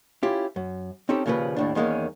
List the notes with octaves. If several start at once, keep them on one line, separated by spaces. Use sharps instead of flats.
C#4 E4 F4 G4
F#2
C4 C#4 D#4 G4 A4
D#2 A#2 C#3 F3 B4
D#2 A2 D4
E2 D#3 G#3 A#3 C#4